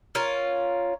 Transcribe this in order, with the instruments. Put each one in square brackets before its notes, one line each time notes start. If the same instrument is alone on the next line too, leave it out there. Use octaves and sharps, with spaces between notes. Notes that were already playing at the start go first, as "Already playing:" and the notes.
[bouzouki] C#4 F4 A#4